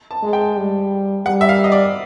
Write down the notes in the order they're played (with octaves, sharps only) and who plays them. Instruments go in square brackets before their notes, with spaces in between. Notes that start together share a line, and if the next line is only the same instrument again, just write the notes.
[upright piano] A5
[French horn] G#3
[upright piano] G5
[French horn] G3
[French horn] G3 [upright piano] F#5
[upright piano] E5
F5
D#5
D5